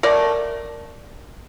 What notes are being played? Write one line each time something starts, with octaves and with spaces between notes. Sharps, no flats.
D3 A3 A#4 D5